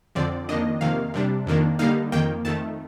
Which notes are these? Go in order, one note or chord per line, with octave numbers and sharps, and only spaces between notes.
F2 D3 F3 C4 D5
F2 D#3 A#3 D4 D#5
F2 C3 D#3 A#3 F5
C3 G3 D4
F2 D#3 A#3 D4
D3 G3 A#3 D#4 F5
F2 D#3 A#3 G5
F2 D#3 A3 A5